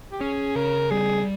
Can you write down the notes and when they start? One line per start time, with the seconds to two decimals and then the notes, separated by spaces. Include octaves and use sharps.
0.12 G4
0.21 C#4 G#4
0.55 C#3 A#4
0.90 G3 G#4